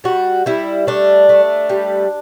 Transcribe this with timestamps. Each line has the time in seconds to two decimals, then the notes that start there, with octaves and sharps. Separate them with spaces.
0.04 G3 F#4
0.46 G3 E4
0.87 A3 D4
1.29 A3
1.70 G3